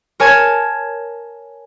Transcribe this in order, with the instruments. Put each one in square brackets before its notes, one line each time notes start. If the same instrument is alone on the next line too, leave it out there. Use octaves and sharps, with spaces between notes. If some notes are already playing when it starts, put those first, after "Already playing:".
[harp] A#4 C#5 G#5 A5 G#6